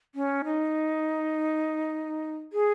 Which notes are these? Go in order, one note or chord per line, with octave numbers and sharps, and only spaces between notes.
C#4
D#4
G#4